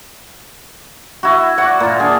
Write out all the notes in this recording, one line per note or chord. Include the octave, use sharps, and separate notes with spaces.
E4 F#4
F#4 D5 F#5
A#2 F4
D4 G#4